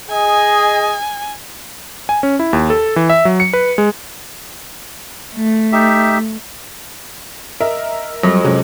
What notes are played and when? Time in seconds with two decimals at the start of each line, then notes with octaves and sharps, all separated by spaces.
0.10 G#4 D#5 G#5
2.09 G#5
2.23 C#4
2.39 E4
2.53 D#2
2.70 A4
2.96 E3
3.10 E5
3.25 F#3
3.40 C#7
3.53 B4
3.78 G#3
5.35 A3
5.72 D#4 G4 E5
7.60 A#4 D#5 E5
8.23 F2 F#3 G3
8.44 C3 F#3 G#3 C#4